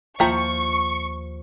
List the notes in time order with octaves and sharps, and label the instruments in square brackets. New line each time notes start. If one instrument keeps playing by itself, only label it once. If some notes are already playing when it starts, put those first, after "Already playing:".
[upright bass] D#2 [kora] F3 [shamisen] E5 G5 A#5 [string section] C#6